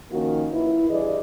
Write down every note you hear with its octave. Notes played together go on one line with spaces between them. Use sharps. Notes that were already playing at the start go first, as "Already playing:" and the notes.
D#3 F3 A#3 C#4 F4 F#4
E4 B4
G2 E3 G#4 D5 D#5